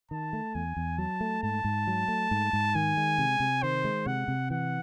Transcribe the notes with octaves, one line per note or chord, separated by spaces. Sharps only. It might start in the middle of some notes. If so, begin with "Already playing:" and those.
D#3 A5
A3
E2 G#5
E2
F#3 A5
A3
G#2 A5
G#2
F#3
A3
G#2
G#2
D#3 G#5
G#3
C3
C3
D#3 C5
G#3
C3 F#5
C3
E3 F#5